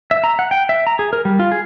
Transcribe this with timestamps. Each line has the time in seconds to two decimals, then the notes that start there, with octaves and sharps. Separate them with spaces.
0.11 E5
0.24 A#5
0.39 F#5
0.51 G5
0.69 E5
0.87 A#5
0.99 G#4
1.13 A#4
1.25 G3
1.39 F4
1.52 G#4